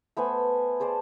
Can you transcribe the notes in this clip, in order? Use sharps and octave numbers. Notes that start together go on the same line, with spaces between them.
A3 B3 C5 G#5
G#4 C5 D5 A5